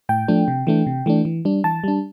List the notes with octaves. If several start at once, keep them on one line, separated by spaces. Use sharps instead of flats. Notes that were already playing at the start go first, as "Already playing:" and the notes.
A2 G5
F3 A3 D4
C3
E3 A3 D4
C3
E3 A3 D4
E3
G3 D4
E3 A5
G3 D4